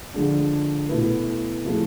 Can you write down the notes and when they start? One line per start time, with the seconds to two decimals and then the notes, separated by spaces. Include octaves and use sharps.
0.14 D3 F3 G#3 D4
0.89 B2 A3 E4 B4
1.65 C3 F3 A3 E4 G#4